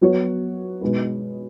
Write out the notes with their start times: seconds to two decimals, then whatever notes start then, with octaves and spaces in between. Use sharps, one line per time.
0.01 F#3 B3 F#4 C#5
0.81 B2 G#3 D#4 B4